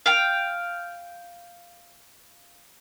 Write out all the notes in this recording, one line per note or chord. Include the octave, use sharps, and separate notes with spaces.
F5 G5